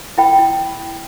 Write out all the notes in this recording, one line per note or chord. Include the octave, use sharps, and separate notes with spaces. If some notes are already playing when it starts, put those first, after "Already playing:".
E4 G5 B5
E4